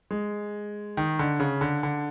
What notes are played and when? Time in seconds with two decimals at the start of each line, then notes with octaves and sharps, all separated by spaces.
0.11 G#3
0.97 D#3
1.19 D3
1.40 C#3
1.61 D3
1.83 D3